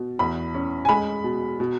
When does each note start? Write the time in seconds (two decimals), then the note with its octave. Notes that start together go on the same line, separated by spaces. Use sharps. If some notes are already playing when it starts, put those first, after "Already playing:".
Already playing: B2
0.19 E2 B5
0.54 C#4
0.85 G#5
0.89 G#3 B5
1.24 B2
1.60 B2